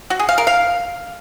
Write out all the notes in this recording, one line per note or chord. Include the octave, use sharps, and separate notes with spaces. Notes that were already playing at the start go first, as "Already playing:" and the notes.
F#4
G#4
F5
A#4
F5